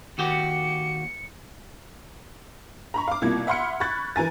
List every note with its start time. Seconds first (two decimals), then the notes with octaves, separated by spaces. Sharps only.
0.18 D#2 F#4 G4 C#7
2.94 A#5 B5 C#6
3.08 F5 D6
3.22 C2 B2 A#3 E4 F4 G#6
3.47 E5 F#5 B5 C6 F6 C#7
3.80 B5 C#6 F#6 G#6 A6
4.16 E3 A#4 G#5 A6